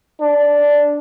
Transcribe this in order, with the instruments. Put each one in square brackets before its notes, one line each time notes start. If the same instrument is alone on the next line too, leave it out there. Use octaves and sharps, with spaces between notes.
[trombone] D4